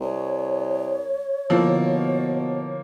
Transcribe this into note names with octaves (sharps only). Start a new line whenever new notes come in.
C2 C#5
B2 D3 F3 A#3 E4